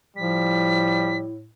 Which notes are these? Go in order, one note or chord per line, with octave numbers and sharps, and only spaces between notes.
A2 F3 G3 B6